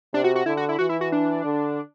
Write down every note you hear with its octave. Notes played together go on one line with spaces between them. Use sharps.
C3 D4
F#4
F#4
D3 E4
F#4
E4
E3 F#4
E4
F#4
D4
D3